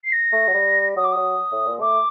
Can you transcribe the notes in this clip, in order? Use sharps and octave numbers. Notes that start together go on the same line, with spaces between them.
C7
A#6
A3
F#3
G3
F#3 D#6
D6
F#3 D#6
A2
A#2
A3 D6